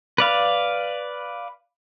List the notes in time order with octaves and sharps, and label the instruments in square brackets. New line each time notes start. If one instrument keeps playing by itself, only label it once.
[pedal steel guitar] B4 D5 F5